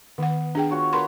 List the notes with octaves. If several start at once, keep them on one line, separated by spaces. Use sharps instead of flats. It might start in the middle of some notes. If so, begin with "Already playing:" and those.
D#3 B3 F#5
D4 G#4 G5
F4 F#4 C#5
A#4 B4 C#5 C6